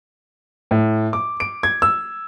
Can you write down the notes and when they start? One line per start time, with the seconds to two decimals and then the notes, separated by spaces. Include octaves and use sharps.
0.71 A2
1.13 D6
1.40 D7
1.63 G#6
1.82 E6